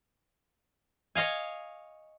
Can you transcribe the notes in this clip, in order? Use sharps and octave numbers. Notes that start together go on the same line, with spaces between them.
C#5 D#5 F5 G#5